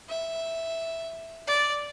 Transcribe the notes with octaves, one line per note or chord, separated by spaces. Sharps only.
E5
D5